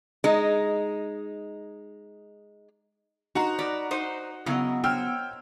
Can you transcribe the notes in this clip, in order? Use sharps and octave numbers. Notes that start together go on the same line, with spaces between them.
G#3 D#4
D#4 F#4 C5 F#5 A#5
A#4 D5 B5
D#4 C5
C#3 F#3 B3 E4 A#4 D#5
C5 C#5 G5 E6 F6